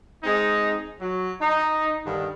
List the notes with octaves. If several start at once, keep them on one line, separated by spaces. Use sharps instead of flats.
G#3 C4 D#4
F#3
D#4
G2 D3 D#3 D4